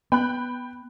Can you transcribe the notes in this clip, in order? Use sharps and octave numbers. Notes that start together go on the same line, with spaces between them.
B3 G5 B5 F#6